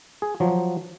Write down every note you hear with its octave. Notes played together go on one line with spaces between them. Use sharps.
G#4
F3 F#3